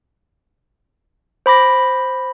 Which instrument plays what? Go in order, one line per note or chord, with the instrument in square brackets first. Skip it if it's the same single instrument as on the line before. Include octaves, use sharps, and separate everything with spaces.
[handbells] C5 B5 D6 A#6